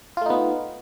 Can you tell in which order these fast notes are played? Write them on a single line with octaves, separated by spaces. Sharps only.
F4 A3 D#4 B3